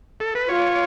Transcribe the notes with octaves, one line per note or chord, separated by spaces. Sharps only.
A4
B4
F4 C#5